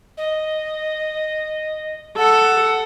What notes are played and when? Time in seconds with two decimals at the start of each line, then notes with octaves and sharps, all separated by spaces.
0.17 D#5
2.17 A4 F#5